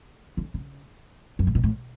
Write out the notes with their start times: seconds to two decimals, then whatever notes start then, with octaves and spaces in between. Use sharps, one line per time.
0.37 D3
0.54 C#3
1.39 F#2
1.47 A2
1.55 B2
1.63 A2